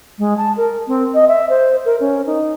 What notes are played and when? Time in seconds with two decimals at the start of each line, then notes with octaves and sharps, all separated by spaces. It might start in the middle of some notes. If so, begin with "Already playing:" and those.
0.19 G#3
0.37 A5
0.57 A#4
0.88 C4
1.14 D#5
1.28 E5
1.49 C5
1.86 A#4
2.01 C#4
2.26 D#4